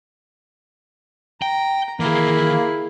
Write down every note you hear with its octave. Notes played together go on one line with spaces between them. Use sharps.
G5 A#5
D#3 E3 A#3 E4 G#4